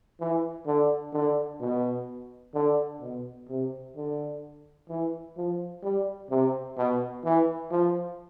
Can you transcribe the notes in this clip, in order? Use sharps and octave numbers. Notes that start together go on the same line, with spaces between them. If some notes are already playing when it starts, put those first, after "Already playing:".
E3
D3
D3
B2
D3
B2
C3
D3
E3
F3
G3
C3
B2
E3
F3